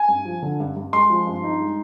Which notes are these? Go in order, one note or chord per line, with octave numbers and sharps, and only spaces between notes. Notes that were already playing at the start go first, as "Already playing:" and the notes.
Already playing: G#5
G2
F3
D3
G2
G2
G#3 C6
F3
G2
D#4
G#3